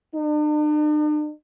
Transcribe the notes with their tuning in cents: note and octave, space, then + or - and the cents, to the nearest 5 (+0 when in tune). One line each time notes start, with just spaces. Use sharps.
D4 +45